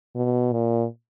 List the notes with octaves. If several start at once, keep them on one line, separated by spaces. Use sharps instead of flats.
B2
A#2